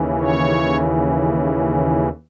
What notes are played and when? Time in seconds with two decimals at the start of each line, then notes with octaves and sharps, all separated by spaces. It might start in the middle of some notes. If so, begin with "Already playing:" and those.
Already playing: D#2 C#3 E3
0.20 C#5